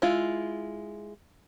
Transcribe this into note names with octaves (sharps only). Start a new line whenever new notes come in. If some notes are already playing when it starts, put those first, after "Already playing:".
G#3 E4 F4